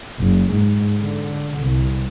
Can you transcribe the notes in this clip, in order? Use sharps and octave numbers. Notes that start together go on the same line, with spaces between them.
F#1
G#2
D3
C2